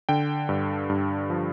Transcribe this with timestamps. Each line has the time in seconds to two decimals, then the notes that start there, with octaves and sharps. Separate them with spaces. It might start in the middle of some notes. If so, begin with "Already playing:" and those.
0.09 D3 G5
0.49 G2
0.90 G2
1.30 F3